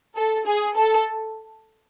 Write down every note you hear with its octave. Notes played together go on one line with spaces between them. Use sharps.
A4
G#4
A4